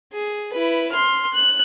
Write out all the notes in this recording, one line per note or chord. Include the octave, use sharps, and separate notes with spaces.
G#4
E4 B4
C6 F6
F#6